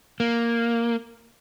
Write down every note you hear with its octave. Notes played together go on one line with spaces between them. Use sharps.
A#3